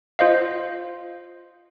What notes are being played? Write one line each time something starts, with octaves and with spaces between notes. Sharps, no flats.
F4 C5 D#5 F5